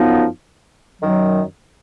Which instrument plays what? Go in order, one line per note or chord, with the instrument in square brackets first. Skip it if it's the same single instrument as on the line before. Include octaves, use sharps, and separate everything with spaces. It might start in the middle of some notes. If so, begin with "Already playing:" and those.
Already playing: [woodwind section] F#2 F3 B3 D#4
F#2 D#3 F#3